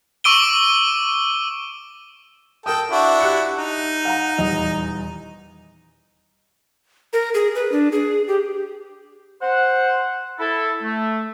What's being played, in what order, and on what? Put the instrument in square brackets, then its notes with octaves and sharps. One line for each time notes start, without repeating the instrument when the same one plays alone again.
[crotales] C#6 D6 E6 D7 D#7 G7
[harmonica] A4 G5 [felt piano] A#4 D#6
[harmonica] D4 E4 F#4
[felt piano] G4 F#6 C#7
[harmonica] D#4
[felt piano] F5 F#5 A#5
D#1 E2 D#5
[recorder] A#4
G#4
B4
D4
G#4
G4
[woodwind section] C5 F#5
E4 A4
A3